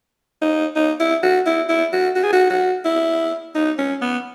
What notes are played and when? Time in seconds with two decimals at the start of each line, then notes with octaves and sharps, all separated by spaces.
0.41 D#4
0.75 D#4
0.99 E4
1.23 F#4
1.46 E4
1.69 E4
1.92 F#4
2.15 F#4
2.24 G#4
2.32 F#4
2.50 F#4
2.85 E4
3.55 D#4
3.78 C#4
4.01 B3